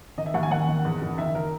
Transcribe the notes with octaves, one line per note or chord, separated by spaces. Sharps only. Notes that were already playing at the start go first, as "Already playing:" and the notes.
D#3 D#5
E5
D#2 F#5
G#5
D#2 F#5
D#3
E2
F#1
D#3 E5
A#4